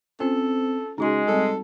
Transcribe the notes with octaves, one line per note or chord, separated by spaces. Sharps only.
C4 C#4 F4 A4 C5
C#3 G#3 D#4 F#4 C6
C3 G3 C4 A4